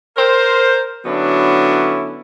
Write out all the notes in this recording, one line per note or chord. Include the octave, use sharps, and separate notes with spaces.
A#4 C5
D3 F#3 B3 C#4 D4 E4